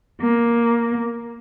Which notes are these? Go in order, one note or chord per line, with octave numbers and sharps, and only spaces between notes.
A#3